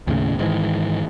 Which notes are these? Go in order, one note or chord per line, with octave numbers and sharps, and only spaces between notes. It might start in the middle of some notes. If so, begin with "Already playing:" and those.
D#2 A2 C#3
G#2 D#3 E3